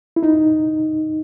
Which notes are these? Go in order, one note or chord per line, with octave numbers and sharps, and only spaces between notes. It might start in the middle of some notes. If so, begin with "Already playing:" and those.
E4
D#4